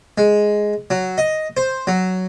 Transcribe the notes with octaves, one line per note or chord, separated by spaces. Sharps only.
G#3
F#3
D#5
C5
F#3